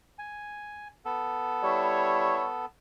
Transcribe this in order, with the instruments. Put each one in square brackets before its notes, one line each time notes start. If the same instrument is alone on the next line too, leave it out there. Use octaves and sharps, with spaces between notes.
[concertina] G#5
B3 A4
[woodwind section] G3 E4 C#5